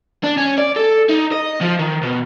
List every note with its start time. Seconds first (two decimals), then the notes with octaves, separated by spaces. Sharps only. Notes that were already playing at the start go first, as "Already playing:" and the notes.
0.23 D4
0.37 C#4
0.58 D5
0.76 A4
1.09 D#4
1.32 D#5
1.61 F3
1.79 D#3
2.03 B2